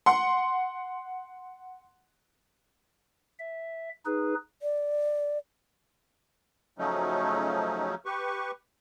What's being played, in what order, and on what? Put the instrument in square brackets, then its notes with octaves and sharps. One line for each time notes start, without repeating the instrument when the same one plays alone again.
[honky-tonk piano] F#5 C6
[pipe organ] E5
D#4 G#4 B4
[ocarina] D5
[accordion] C#3 F3 F#3 A3 C#4 D#4
G4 B4 C#6